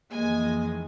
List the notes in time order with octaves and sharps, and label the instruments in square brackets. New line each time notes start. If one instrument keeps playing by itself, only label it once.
[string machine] F2 D#3 E3 [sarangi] G#3 [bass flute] A#3 [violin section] G#5